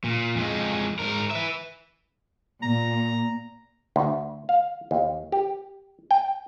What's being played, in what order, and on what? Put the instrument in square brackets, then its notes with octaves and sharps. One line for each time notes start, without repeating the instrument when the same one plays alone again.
[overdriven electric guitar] A#2
F2 G#3
G#2 A#4
B4 E5
[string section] A#2 [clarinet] A#5
[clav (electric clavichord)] D2
F5
D#2
G4
G5